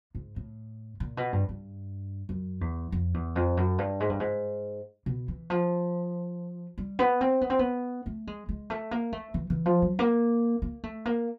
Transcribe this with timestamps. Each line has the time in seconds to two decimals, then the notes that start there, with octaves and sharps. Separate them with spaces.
0.15 G#2
0.36 A2
1.00 A#2
1.17 B2
1.33 G2
1.49 G2
2.29 F#2
2.61 E2
2.92 F2
3.14 E2
3.36 F2
3.57 F#2
3.78 G2
4.00 G#2
4.10 G2
4.20 G#2
5.06 B2
5.28 E3
5.50 F3
6.78 G3
6.99 B3
7.21 C4
7.41 B3
7.50 C4
7.59 B3
8.06 A3
8.27 G#3
8.49 G#3
8.70 A3
8.91 A#3
9.13 A3
9.34 E3
9.50 E3
9.66 F3
9.82 F#3
9.99 A#3
10.62 A#3
10.83 A3
11.05 A#3